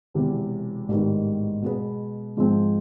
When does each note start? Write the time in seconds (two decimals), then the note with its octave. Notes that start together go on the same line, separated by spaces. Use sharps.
0.14 E1 E2 C3 E3
0.88 A1 G#2 D#3 G3 B3
1.62 B2 G#3 B3
2.37 G#2 F3 G#3 C4